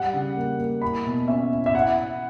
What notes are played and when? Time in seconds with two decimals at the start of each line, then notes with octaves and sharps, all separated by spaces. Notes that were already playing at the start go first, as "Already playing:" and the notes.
Already playing: G3 F#5
0.14 C#3
0.36 A#3
0.59 A#3
0.82 E4 B5
1.06 B2
1.28 C#4 E5
1.52 E4
1.66 E5
1.75 E4 F#5
1.98 E4